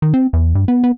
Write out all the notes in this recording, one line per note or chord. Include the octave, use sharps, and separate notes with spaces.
D#3
C4
E2
G2
B3
B3